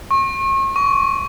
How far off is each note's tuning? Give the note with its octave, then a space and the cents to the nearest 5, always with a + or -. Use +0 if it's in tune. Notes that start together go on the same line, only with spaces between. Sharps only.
C#6 -40
C#6 +30